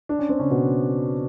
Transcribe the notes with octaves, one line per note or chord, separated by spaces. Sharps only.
D4
C#4
C4
C#3 C#4
B2 B3